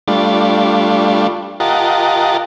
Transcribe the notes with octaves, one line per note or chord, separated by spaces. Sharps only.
G3 A3 D4 F4
F4 G4 A#4 D#5 F#5 A5